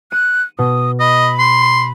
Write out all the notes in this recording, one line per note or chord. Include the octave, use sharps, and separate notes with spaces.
F#6 D#7
B2 D#6
D#5 B5
C6